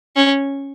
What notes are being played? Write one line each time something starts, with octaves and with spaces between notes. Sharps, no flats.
C#4